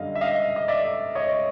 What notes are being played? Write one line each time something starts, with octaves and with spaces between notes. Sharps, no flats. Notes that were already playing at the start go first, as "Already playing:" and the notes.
Already playing: F#2 D3 G3 D#5 F5
E5
D#5 F5
D#5
D5 E5
C#5 D#5